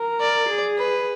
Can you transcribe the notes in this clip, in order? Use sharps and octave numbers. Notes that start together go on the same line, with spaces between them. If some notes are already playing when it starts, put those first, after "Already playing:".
Already playing: A#4
D5
G#4
B4